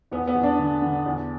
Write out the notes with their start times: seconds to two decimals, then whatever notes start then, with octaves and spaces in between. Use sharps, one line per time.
0.11 E2 B3
0.27 B3
0.35 E2
0.43 D4
0.59 D3
0.82 D3
1.06 E2